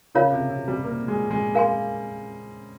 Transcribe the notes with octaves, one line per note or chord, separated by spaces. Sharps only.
C#3 F4 A#4 C#5 F5
C3
C3
G3
A#3
G#3
G#3
A#4 F5 G#5 C6